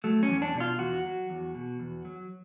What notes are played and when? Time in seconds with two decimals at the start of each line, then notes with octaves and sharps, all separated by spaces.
0.04 F#3 A3
0.23 C#4
0.29 E2
0.42 D4
0.54 B2
0.60 F4
0.78 E2 F#4
1.04 F#3
1.30 E2
1.55 B2
1.80 E2
2.05 F#3